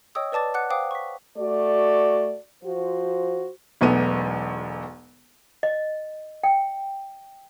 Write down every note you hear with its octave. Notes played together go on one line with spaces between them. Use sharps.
C#5 D#5 G5 C#6 D#6 E6
B4 D5 A5 D6 A6
F#5 D6 F#6 C#7
C5 F5 G5 D6 D#6
C#6 B6
A3 F#4 D5
F3 F#4 C5
E1 B1 A3 B3 D#7
D#5
G5